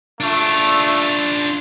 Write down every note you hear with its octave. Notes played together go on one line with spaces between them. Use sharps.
A3 D4 F4